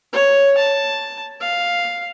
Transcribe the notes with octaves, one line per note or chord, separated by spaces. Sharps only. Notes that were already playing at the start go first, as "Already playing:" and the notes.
C#5
A5
F5